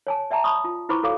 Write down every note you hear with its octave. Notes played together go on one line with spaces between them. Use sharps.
C#5 G#5 A5
D5 E5 G5 A5 A#5
A5 B5 C#6 D#6
F4
E4 B4 C5 B5 C#6 D6
F#4 A4 C#5 F5 D6